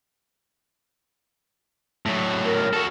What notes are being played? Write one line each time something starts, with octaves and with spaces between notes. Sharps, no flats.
A2 F#3
A#4
F#4 A4